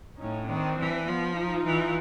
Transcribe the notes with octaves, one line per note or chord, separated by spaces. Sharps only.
A2 C#4 D#4
D#3 C4 D4
E3
F3 B3
D#4 F4
E3